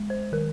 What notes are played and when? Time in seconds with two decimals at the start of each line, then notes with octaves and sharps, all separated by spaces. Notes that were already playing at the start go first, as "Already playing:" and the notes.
Already playing: G#3
0.10 C5
0.32 D#3 A#4